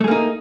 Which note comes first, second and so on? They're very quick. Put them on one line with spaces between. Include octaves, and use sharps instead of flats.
A3 G#4 A#3 D#4